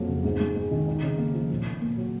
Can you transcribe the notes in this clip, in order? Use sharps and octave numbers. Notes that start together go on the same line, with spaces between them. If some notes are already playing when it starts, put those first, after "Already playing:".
Already playing: F2 F#3 A#3
C#3
G#2
G#2
G#3
D#3
D#4
C#3
A#3
F3
A#2
A#2
A#3
F#3